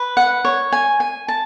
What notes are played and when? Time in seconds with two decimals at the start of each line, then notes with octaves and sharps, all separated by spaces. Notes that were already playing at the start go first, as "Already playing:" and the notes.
Already playing: B4
0.17 F#5
0.45 C#5
0.72 G#5
1.00 G#5
1.28 A5